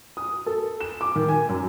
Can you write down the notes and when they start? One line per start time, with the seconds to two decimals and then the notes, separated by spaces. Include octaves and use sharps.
0.17 D#6
0.46 A4
0.81 E7
1.01 D6
1.16 D#3
1.28 G#5
1.49 F#2